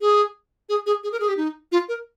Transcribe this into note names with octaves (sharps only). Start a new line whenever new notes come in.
G#4
G#4
G#4
G#4
A#4
G#4
G4
D#4
F4
A#4